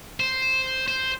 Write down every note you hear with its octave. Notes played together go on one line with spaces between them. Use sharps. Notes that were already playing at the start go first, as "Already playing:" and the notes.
C5
C5